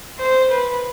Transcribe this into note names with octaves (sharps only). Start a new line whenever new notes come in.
C5
B4